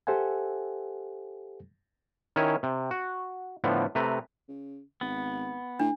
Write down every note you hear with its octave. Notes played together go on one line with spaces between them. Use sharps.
G4 A4 C5 E5 F#5 G#5
D#3 C#4 E4 C#5 G#5
C3
F#4
A2 D3 F3 B3
C3 A3 B4 A#5
C#3
G#1 B3
A2 D4